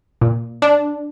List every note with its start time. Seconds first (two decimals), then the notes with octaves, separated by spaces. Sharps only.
0.21 A#2
0.62 D4